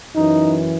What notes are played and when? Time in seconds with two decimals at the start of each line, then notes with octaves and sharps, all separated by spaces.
0.14 F#2 E3 D#4